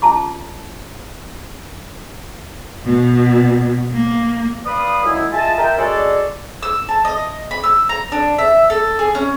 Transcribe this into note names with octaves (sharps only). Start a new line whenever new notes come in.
C#4 F4 A5 A#5 D6
B2
A#3
B4 D5 F5 B5 D#6
F#2 G#3 E4
F4 G#4 D#5 E5 A5
A#4 E5 G5
G#3 C#4 F#4 G#4 A4 D5
E6
A5
D#5
B5
E6
A#5
D4
E5
A4
G#4
C#4